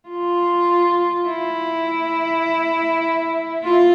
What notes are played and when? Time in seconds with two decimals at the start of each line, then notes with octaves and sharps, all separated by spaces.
0.09 F4
1.27 E4
3.64 F4